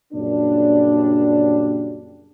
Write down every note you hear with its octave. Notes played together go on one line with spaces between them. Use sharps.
F#2 A#2 C#3 G3 D4